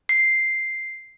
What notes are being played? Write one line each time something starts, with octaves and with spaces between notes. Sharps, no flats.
C7